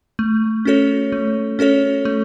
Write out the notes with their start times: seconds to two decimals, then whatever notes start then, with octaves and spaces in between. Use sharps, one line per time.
0.19 A3
0.65 C#4 F#4 A4 C#5
1.12 A3
1.59 C#4 F#4 A4 C#5
2.05 A3